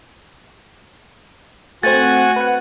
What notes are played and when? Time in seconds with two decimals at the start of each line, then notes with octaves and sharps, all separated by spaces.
1.83 A3 C4 F#4 F#5 G#5 A6
2.36 B4 F#5